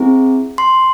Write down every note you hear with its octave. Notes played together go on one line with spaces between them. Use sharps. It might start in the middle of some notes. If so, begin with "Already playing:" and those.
Already playing: C4 E4 G#4
C6